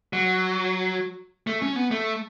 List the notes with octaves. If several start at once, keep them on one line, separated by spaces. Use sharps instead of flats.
F#3
A3
C#4
B3
A3